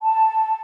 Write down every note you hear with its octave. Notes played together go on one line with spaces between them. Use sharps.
A5